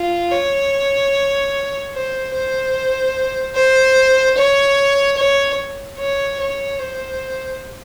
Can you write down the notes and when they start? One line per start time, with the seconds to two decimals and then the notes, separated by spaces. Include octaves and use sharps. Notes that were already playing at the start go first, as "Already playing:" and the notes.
Already playing: F4
0.31 C#5
1.94 C5
2.34 C5
3.55 C5
4.37 C#5
5.17 C#5
5.98 C#5
6.39 C#5
6.79 C5